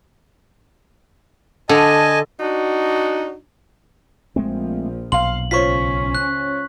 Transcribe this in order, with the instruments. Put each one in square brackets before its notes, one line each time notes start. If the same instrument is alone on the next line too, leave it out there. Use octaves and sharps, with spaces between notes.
[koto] D3 [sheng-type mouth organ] D#5 G#5 A5
[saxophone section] D4 D#4 F#4
[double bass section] A#1 F3 [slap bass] G#3 A3 C4
[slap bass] B1 [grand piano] F5 C6 [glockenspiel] F#7
[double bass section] C#2 C#4 [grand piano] F4 C5 C#5 [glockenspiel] C#6 B6
[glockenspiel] F#6